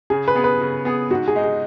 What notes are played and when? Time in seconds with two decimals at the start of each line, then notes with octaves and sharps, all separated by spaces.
0.10 C#3 G#4
0.28 B4
0.35 B3 G#4
0.44 B4
0.61 C#3
0.85 B3 G#4
1.10 G#2 F#4
1.28 G#4
1.36 G#3 D#4
1.44 G#4